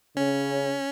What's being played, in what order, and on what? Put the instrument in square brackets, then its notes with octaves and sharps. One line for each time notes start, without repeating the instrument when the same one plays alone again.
[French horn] C#3 [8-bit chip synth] C#4